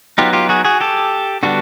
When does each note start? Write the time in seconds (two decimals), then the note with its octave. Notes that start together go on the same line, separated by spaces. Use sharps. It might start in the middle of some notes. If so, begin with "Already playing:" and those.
0.18 F#3 B3 D#4 F4 G4
0.33 F4 G4
0.49 F#4 G#4
0.65 F#4 G#4
0.81 G4 A4
1.43 D3 G3 B3 D4 F#4